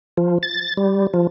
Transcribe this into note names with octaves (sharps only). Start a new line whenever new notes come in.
F3
A6
G3
F3